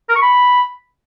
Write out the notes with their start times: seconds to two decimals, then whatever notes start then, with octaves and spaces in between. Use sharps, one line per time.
0.09 A#4
0.15 C#6
0.22 B5